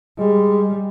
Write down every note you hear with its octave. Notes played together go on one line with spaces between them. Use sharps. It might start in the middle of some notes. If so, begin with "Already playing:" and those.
G3 G#3